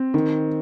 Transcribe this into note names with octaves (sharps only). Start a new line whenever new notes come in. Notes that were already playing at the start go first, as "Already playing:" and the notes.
Already playing: C4
D#3